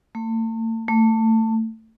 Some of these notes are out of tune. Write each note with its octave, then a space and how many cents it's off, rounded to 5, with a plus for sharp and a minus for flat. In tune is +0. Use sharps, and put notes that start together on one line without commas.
A3 +40
A3 +20